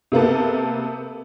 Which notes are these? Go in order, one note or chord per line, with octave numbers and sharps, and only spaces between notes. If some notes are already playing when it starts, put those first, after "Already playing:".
C3 A#3 B3 A4